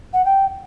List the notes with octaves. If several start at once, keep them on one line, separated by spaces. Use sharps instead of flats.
F#5
G5